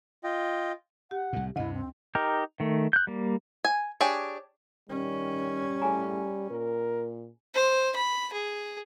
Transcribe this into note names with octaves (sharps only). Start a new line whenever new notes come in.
F4 D#5 G5
G4 F#5
C2 A2
D2 G2 C3 E4 D#5
C4
D#4 G4 A#4
D#3 A3
F#6 G6
G3 A#3
G#5
D4 G4 G#4 C#5
D#3 G3 C#4
A2 G#4 G#5 A#5
A#2 A#4
C5
B5
G#4